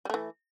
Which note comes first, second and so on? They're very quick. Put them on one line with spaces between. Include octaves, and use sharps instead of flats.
G3 A3 E3